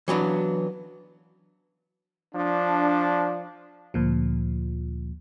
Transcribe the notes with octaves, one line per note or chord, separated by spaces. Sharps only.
E3 F#3 B3 D4
F3 D4
D2 A#2 F3